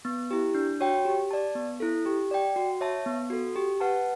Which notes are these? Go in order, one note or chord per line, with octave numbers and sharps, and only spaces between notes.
B3
E4 G4
D4
F#4 C#5 G5
G4
D5 A5
B3
E4 A4
G4
D5 G5
F#4
C#5 E5 A5
B3
F#4 A4
G4
B4 F#5 A5